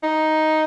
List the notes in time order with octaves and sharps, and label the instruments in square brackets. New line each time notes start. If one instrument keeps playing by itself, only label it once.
[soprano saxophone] D#4